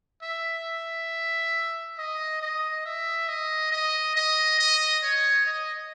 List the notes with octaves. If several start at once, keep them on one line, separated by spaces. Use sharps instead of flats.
E5
D#5
D#5
E5
D#5
D#5
D#5
D#5
C#5
D#5